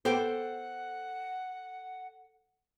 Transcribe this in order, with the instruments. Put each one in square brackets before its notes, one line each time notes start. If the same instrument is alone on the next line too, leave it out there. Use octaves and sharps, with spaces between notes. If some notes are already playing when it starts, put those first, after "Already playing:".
[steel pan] B3 G4 G5 [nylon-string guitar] A4 C5 [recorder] F#5